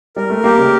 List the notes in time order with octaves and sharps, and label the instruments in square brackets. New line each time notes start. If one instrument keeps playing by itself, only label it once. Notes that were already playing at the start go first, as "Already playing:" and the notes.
[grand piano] G3 [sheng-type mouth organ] A#4
[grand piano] A3
[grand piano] A#3 [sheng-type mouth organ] G4
[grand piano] C#3